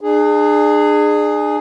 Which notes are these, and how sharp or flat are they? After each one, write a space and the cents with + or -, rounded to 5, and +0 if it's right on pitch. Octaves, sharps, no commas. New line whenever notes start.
D4 +40 G#4 +0